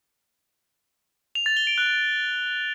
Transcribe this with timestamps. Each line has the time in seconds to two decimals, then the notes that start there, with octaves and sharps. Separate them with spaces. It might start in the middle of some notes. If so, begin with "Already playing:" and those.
1.35 F7
1.46 A6
1.57 G7
1.67 D7
1.78 F#6